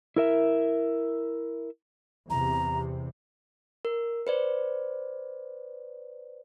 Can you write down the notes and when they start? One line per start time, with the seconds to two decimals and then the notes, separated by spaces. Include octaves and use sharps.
0.16 E4 A#4 E5
2.30 E2 C3 A#5
3.85 A#4
4.27 B4 C5 D5